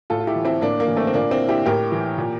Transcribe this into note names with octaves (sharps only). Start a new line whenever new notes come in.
A2 F4 A4
F4
E4 G4
E3
C4 E4
A2 A#3 D4
A#3
E3
A3 C4
C4
A#2 A#3 D4
C4 E4
E4 G4
A2 G4 A#4
E3
A#2